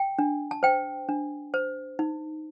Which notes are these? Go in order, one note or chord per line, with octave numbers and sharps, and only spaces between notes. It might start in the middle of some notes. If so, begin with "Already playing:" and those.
Already playing: G5
D4
A5
C5 G5
D4
C5
D#4